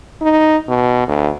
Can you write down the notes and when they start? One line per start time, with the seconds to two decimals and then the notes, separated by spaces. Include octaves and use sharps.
0.21 D#4
0.68 B2
1.08 D2